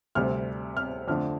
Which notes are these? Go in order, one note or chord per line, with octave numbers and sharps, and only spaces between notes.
D2 C3 G3 C4 F6
F6
F2 D3 A3 D4 F6